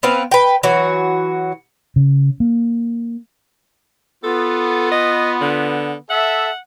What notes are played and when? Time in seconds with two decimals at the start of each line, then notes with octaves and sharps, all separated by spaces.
0.03 B3 C4 B4 F5
0.31 B4 G5
0.63 E3 F#3 F#4
1.96 C#3
2.40 A#3
4.24 B3 F4 A4
4.91 D#5
5.41 D3
6.10 A4 E5 F#5